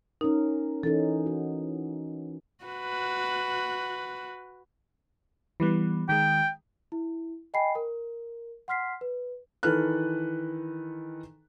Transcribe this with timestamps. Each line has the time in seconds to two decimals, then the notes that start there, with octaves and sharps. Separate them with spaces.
0.21 C#4 D#4 A#4
0.83 E3 C#4 D#4 A4
1.26 F#4
2.65 F#4 B4
5.60 E3 G3 B3
6.09 D#3 G#3 G5
6.92 E4
7.54 D#5 G5 G#5 B5 C7
7.75 A#4
8.68 F#5 C6 F6 B6 C7
9.01 B4
9.63 D#3 E3 A4 B4 F6 F#6